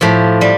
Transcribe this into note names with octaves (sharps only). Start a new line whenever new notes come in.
A2 F3 G4
G3